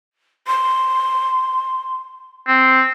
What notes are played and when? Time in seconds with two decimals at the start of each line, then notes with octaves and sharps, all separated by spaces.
0.48 C6
2.48 C4